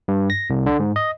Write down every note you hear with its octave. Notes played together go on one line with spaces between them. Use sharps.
G2
A#6
C2
D3
G#2
D#5